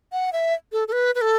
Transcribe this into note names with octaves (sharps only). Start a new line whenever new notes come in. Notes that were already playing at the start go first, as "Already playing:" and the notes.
F#5
E5
A4
A4
B4
B4
A4